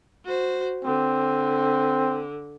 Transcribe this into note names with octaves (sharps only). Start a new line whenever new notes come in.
F#4 C5
D3 C4